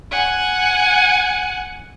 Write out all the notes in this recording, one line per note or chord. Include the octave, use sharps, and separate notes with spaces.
F#5 G#5